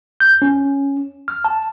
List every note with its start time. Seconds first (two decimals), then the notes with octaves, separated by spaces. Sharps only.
0.20 G6
0.42 C#4
1.28 F6
1.45 A5